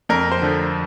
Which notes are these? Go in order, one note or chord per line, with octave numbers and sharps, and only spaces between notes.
F2 A#4
C5
D3 F3